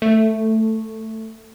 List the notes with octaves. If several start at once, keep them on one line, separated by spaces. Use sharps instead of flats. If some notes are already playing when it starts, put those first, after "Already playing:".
A3